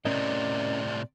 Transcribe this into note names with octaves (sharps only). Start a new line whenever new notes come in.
A2 C3 C#4 A#4 D5 D#5